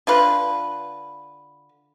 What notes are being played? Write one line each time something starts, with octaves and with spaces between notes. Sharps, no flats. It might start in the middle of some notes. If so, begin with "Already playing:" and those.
D3 F4 B4